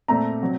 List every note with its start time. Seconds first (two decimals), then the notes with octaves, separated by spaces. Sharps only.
0.08 A#2 A3 C4 A#5
0.41 C3 F#3 C4